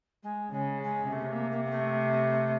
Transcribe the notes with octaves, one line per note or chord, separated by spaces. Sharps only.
G#3
C#3 G#3
G#3
C3 A3
A#3
A#3
A#3
A3